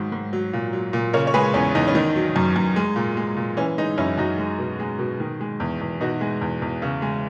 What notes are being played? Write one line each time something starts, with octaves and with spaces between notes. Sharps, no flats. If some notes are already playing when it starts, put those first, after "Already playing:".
Already playing: G#2 D#3 F#3
G#2
F#3
A#2
F#3
A#2
C#3 A#4 C#5
C#5
G#3 G#4 B4
E2 C#4
E2 D#4
C#4
D#3 D#4
F#3
F#2
F#2
G#3
A#2
G#3
A#2
E3 C#4
G#3 D#4
F#2 C#4 E4
F#2 D#4 F#4
G#3
B2
G#3
B2
D#3
G#3
E2
E2
B2 D#4 F#4
G#3
E2
E2
C#3
G#3